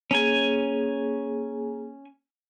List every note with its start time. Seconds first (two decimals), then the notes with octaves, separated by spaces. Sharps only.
0.11 A#3 C#4 G#4 G#5